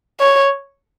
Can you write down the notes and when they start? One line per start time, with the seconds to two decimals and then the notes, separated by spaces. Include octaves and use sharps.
0.20 C#5